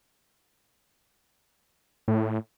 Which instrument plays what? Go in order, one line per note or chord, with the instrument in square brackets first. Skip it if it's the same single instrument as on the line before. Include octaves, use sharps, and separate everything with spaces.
[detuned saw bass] A2